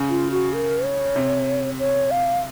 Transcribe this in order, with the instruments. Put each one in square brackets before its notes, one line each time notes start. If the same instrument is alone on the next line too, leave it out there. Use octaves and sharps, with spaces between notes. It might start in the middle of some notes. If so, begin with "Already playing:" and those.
Already playing: [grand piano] C#3
[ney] F4
F#4
A#4
C#5
[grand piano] C3
[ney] C#5
F5